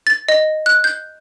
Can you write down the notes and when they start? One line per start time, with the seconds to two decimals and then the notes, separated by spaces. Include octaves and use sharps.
0.07 A6
0.29 D#5
0.66 F#6
0.84 G6